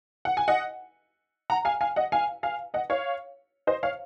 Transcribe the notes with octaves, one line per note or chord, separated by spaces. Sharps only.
F#5
G#5
D#5 F#5
F#5 A#5
F5 G#5
F5 G#5
D#5 F#5
F5 G#5
F5 G#5
D#5 F#5
C#5 F5
C5 D#5
C#5 F5